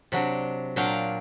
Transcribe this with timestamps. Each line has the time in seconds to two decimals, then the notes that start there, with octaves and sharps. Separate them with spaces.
0.12 C3 F#3 D4
0.76 A#2 F#3 D4 F5 G5 A#5